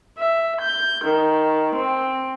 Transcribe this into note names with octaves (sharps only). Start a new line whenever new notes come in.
E5
G6
D#3
C4